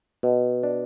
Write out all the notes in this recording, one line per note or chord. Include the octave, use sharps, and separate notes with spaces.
B2
D4